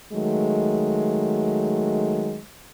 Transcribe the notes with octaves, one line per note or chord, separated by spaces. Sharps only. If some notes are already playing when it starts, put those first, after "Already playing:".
D#3 F#3 G#3 A3